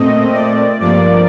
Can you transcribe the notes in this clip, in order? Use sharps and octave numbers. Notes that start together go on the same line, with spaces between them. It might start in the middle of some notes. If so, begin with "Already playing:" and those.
Already playing: A#2 A3 C4 D#5
D5
G2 F3 A#3 D5